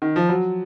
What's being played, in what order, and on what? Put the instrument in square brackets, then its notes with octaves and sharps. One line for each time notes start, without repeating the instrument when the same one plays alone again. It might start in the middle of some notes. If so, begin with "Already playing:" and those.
[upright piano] D#3
F3
F#3